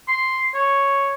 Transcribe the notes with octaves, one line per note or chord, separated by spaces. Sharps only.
C6
C#5